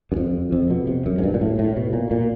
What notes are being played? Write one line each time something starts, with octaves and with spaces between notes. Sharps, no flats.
F#2
F2
F2
B2
C3
F#2
G#2
G2
A#2
A2
A2
B2
A#2
A#2